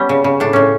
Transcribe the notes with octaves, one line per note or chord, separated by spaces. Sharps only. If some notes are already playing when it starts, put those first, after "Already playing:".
Already playing: G3 B3 C#4
C#3
C#3
A2 D4
A2 C#4